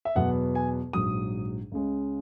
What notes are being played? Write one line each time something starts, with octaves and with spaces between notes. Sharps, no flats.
E5
E2 B2 F#3 B3 F#5
G#5
A#1 G#2 F#3 D#6
C#2 C#3 G#3 C#4